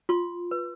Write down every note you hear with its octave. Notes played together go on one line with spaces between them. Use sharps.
F4 C6
B4